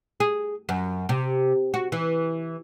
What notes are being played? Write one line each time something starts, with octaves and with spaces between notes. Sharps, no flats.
G#4
F#2
C3
F#4
E3